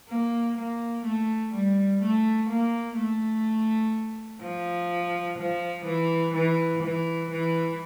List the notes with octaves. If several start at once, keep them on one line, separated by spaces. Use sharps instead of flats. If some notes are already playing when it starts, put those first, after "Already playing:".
A#3
A#3
A3
G3
A3
A#3
A3
F3
F3
E3
E3
E3
E3